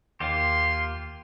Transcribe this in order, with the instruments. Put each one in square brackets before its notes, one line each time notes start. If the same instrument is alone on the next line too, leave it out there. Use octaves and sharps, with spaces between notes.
[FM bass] D#2 [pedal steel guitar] A#3 F4 G4 [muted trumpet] C6